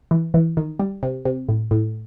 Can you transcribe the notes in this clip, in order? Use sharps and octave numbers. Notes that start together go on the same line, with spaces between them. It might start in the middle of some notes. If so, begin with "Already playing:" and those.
E3
E3
D#3
G3
C3
C3
A2
A2